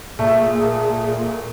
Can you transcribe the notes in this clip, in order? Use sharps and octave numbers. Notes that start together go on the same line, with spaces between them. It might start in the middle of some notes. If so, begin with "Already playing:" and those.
A#2 A3 G#4